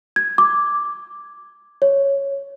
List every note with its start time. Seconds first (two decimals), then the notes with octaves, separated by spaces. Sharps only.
0.16 G#6
0.38 D6
1.82 C#5